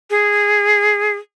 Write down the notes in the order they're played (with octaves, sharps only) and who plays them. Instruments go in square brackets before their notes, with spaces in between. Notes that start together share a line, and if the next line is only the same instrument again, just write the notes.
[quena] G#4